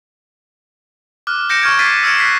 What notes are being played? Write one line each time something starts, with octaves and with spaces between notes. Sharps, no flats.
D6 F6 F#6
G6 A#6 C#7 D7 E7
C#6 F6 G#6 D7
D6 A6 B6 C7 D7 D#7
E6 F6 G#6 C#7 D7 E7
F#6 B6 C7